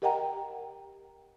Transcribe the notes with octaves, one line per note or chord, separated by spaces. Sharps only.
G4 A#4 D#5 F#5 G5 A#5